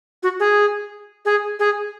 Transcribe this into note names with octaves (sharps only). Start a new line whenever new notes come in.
F#4
G#4
G#4
G#4